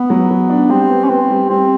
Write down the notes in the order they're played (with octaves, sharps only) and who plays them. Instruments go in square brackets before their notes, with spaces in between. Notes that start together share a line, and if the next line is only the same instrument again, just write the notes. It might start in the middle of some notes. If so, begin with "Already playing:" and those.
Already playing: [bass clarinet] B3
[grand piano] F#3
F#3
D4
[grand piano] G3 [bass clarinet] C4
[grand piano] B3
[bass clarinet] C#4
[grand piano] B3 [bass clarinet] C4
[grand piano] G3
[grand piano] G3 [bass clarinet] C4